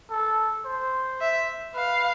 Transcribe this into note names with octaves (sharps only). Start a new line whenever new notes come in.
A4
C5
E5
B4 F5